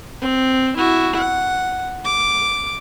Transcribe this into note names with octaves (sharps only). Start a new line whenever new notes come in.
C4
E4 F#4
F#5
D6